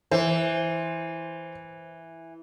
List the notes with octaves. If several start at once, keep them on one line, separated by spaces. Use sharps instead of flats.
E3 C5